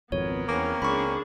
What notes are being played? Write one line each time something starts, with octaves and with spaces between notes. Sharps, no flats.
G#1 F2 B2 B3 A#4 C#5
E2 A#3 C4 C#4
C#2 D4 G#4 B5 C#6